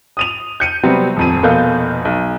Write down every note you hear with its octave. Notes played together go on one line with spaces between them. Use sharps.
D#6 D#7 F7
G6 C#7 D#7
C3 F#3 G3 B3 C4
D#1 F2 D#7
F1 B2 A#3 A4 F5 G6
B1